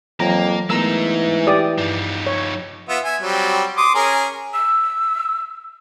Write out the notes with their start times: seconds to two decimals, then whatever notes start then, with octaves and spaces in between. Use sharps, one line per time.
0.20 F2 E3 F#3 A#3 C#5 A#5
0.70 E3 G#3 A3 B3 D#4 A#4 A#5 E6
1.47 G4 D5 D#6
1.78 G2 F3 D#4
2.26 C#5
2.89 B3 F4 E5
3.04 E5 G#5
3.22 F#3 G3 C4
3.77 C6 D6 D#6
3.95 C#4 G#4 A#4
4.54 E6